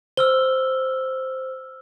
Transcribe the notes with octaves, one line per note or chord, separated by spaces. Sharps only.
C5 E6 F6 G7